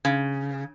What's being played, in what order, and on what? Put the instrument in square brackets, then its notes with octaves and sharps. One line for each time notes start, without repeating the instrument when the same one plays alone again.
[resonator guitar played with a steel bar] C#3